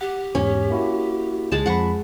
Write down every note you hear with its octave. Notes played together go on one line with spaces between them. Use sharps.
G4 F#5
E2 G#2 C#4
A#3 E4 F#4
C#2 G#3 A5
F2 F3 F#5 B5 C#6